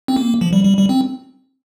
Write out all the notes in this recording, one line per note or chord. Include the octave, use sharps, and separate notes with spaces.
C4
A#3
F3
G3
G3
G3
C4